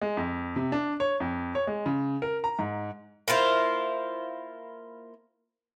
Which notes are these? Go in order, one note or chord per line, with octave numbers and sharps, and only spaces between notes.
G#3
F2
C3
D4
C#5
F2
C#5
G#3
C#3
A#4
A#5
G#2
A#3 E4 F4 C5